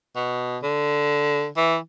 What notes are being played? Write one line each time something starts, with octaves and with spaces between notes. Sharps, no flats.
B2
D3
E3